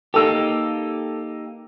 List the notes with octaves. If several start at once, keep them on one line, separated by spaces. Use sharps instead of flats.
A#3 D#4 G4 A4 E6